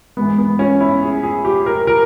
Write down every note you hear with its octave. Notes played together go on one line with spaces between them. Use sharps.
G#2 E3 B3
B3
C#4
E4
G#4
G#4
G4
A#4
A#4